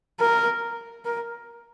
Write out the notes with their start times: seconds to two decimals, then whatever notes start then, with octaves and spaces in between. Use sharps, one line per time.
0.20 A#4
1.05 A#4